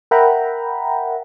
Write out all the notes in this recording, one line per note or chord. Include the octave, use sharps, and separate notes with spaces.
A#4 E5 F#5 G5 A#5 B5